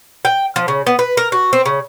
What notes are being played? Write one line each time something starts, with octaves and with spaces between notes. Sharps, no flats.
G5
F3
C#3
B3
B4
A#4
F#4
C4
C#3